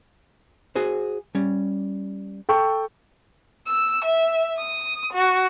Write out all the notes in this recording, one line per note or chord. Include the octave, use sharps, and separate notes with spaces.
F#4 G#4 C5
G3 C#4
A4 G5 C#6
E6
E5
D#6
F#4